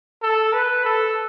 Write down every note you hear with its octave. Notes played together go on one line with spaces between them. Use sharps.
A4
B4
A4